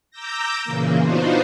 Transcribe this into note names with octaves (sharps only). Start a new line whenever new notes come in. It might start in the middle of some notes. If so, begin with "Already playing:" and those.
A#5 D6 E6 G6 A#6
A#2 C#3 E3 A#3
B3 D4 D#4 F4 F#4 C5